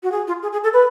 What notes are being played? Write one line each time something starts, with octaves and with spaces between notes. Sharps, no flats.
F#4
G#4
F4
G#4
G#4
A4
B4